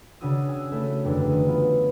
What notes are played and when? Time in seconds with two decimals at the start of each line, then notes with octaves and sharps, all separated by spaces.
0.21 C#3 C#4 D4 F#4 D#6 E6
0.49 G#5 E6
0.72 A3 C#4 E4
1.04 F#1 E2 D3 D4
1.30 D3 D#6
1.47 B3 F4